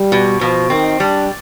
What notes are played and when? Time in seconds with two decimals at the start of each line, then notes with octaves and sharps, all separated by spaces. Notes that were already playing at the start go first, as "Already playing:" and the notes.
Already playing: G3
0.12 B2
0.41 B2 F3
0.70 D#3 C4
1.00 G3 D4